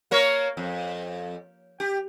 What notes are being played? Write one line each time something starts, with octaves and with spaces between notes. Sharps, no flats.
A#3 A#4 C#5
F2
G4